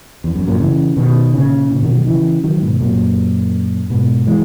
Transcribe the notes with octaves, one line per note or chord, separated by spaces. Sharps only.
E2
F#2
F#2 A#2
C#3 E3
B2 D#3
A#2 C#3
A#2 C#3
B2 D#3
D#3 F#3
C#3 E3
D#3 F#3
G#2 B2
F#2 A#2
G#2 B2
E3 G#3